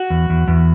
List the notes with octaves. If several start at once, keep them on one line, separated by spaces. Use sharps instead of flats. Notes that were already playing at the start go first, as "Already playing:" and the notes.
Already playing: F#4
E2
E2
E2